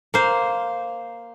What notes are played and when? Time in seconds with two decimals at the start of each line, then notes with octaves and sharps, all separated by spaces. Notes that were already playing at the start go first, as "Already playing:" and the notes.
0.14 A#3 C5